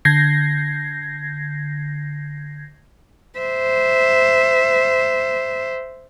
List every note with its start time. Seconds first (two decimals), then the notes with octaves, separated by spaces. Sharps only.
0.05 D3 G6 G#6 A#6 C7
3.39 C5 E5